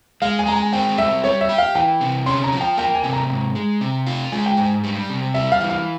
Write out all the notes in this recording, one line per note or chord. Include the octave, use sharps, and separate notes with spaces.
G#3 F5
G#5
G#3 A#5
G#5
C4 G5
G3 E5
G3 C#5
E5
G4
F5
E3 G5
C3
C#4 C6
A#5
F3
G5
A#3 G5
G#5
C3
A#5
G#2
G#3
C3
F4
G#3 G#5
G5
G#2 G#5
G3
C3
G3 E5
F5
E3
F5